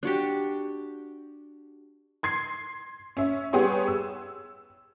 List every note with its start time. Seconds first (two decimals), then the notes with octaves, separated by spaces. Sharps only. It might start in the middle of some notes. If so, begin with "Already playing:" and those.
0.03 D4 F#4 G4
2.23 C6 G#6 C7
3.17 C#4 E5
3.53 G3 B3 G4 G#4 C#5 C6
3.88 E6